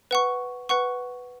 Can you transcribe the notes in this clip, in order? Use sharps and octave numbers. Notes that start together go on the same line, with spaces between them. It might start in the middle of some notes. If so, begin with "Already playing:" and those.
B4 F#5 C#6
B4 F#5 C#6